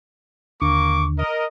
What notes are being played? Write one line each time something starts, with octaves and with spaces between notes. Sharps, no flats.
D#2 D3 A#3 C#6 D6
A#4 D#5